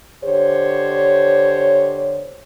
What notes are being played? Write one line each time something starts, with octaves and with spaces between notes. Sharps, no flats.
D3 G4 C5 C#5